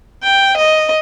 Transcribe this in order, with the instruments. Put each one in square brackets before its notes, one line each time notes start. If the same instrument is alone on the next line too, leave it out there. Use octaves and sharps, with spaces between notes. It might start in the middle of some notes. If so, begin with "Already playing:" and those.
[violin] G5
D#5